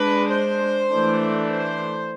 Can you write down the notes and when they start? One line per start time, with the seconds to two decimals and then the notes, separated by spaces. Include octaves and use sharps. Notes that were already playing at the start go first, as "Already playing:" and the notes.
Already playing: G#3 D4 B4
0.33 C5
0.90 E3 A3 D4
1.48 C5